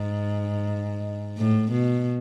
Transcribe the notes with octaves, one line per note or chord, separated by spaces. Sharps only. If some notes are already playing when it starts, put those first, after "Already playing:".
Already playing: G#2
A2
B2